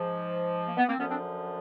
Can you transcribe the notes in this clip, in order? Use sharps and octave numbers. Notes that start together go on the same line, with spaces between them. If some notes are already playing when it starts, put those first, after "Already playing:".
Already playing: G#2 F3
A#3
B3
A#3 C4
F#2 D3 F3 B3 C#4
C4 D4